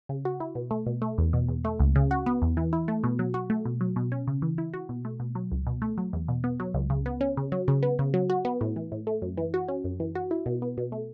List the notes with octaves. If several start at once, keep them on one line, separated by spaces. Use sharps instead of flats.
C#3
F#4
E4
B2
A3
B2
A3
E2
B2
E2
A3
C#2
C#3
F#4
B3
E2
E3
E4
A3
B2
F#3
F#4
A3
B2
F#3
B2
C#4
C#3
E3
E4
F#4
B2
A3
B2
F#3
C#2
B2
A3
F#3
E2
B2
B3
F#3
C#2
C#3
B3
C#4
C#3
F#3
C#3
B3
C#3
F#3
F#4
B3
A2
E3
A2
A3
F#2
E3
F#4
C#4
F#2
E3
F#4
E4
B2
B3
B2
A3